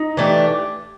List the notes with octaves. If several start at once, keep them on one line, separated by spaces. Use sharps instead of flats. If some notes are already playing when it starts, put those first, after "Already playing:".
Already playing: D#4
E3 A3 D4 G4